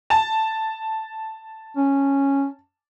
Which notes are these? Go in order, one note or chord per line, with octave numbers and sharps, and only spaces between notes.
A5
C#4